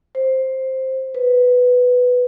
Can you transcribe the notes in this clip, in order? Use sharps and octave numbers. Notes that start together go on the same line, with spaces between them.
C5
B4